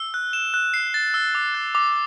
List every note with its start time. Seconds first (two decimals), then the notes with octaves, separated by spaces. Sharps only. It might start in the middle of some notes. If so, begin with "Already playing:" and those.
Already playing: E6
0.14 F#6
0.33 E7
0.54 F#6
0.74 C7
0.94 A6
1.14 E6
1.35 D6
1.55 F#6
1.75 D6